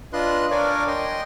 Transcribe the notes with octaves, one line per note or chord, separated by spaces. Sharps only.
D4 F4 B4 D#5 C6 F#6
D4 A#4 C#5 D5 F5 G#5
D#5 G5 C6